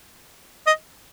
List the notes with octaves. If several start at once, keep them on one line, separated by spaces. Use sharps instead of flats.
D#5